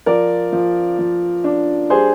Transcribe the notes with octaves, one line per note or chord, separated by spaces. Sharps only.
F3 A#4 D5
F3
F3
D4
G3 G#4 C5